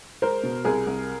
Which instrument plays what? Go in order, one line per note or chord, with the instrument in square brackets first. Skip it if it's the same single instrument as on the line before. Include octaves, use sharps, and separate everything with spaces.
[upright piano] G#3 A#4 C5
B2
C2 G#4 A#4
C2